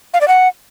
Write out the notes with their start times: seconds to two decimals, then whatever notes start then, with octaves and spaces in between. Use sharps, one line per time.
0.14 F5
0.21 D5
0.28 F#5